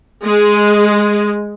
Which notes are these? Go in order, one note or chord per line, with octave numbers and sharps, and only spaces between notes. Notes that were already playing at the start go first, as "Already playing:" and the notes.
G#3